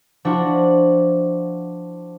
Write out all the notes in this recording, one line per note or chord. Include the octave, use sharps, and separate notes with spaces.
F3 D4 E4 F#4